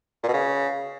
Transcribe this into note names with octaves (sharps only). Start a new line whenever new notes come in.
A#2
B2
C#3